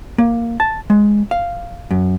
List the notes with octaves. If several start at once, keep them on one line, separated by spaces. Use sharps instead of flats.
A#3
A5
G#3
F5
F#2